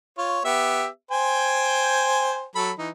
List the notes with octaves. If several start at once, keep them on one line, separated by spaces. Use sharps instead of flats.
F4 C#5
B3 G4 E5
C5 G5 G#5
F#3 A4 B5
E3 D#4